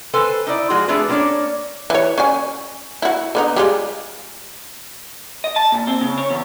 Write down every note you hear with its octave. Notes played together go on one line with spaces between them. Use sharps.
A4 B4 C5 G#5
D#4 E4 D5
F3 G#3 F#4 G#4
A3 D4 F4 G#4 B4
A#3 B3 C#4 D4 C#5 D5
E3 C#5
C#4 D5 G#5
E4 F#4
D3 B3 D#4
G3 G#3 F4
D#5
A5
A#2
C4
C#3
C#5
E2